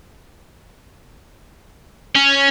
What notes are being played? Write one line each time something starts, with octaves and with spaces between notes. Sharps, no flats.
C#4